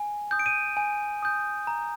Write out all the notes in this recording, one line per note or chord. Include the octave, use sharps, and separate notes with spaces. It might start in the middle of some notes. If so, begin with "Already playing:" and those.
Already playing: G#5
D#6 G6
D7
D#7
G#5
D#6 G6
A#5